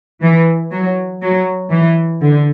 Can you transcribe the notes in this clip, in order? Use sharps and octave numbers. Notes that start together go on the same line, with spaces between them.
E3
F#3
F#3
E3
D3